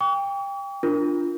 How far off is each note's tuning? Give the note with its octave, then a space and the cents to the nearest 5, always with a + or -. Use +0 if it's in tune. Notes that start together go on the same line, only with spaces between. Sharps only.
G5 +25 C#6 +45
D4 +0 F4 -10 A#4 +0